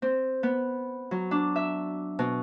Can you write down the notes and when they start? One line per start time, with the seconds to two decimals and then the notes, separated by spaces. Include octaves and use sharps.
0.02 C4
0.43 B3
1.11 F#3
1.31 D4
1.56 E5
2.19 B2